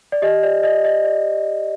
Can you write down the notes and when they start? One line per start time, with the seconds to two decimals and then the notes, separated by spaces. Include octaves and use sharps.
0.12 D5
0.22 G4 D#5
0.43 D5
0.63 D5 D#5
0.84 D5 D#5
1.04 D5